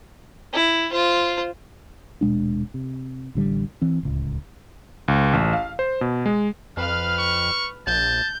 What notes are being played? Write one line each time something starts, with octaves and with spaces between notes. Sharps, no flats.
E4
F4 C5
D#1 B2 G#3 D4
C3
A1 D3 G3
E3 C4
D1 C#2
C#2
A1
F5
C5
B2
G#3
F2 B4 F5 F6
C#6
A#1 A5 G6